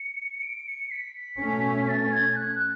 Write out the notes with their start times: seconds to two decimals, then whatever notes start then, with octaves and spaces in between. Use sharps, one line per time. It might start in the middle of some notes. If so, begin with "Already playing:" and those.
Already playing: C#7
0.42 D7
0.67 C#7
0.91 B6
1.40 B2 A3 C#4
1.88 A6
2.12 G#6
2.36 F#6
2.60 F#6